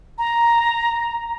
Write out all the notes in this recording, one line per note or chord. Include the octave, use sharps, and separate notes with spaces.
A#5